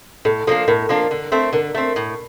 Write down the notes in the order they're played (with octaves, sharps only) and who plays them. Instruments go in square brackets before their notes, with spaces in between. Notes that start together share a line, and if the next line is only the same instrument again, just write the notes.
[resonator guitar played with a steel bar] A2 [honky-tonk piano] A4
[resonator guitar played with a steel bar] F3 A#3 D4 [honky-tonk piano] A4
[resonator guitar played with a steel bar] A2 [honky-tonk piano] A#4
[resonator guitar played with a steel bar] F3 A#3 D4
D3
A3 C4
[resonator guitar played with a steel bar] D3 [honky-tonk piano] A#4
[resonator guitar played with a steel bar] A3 C4
A2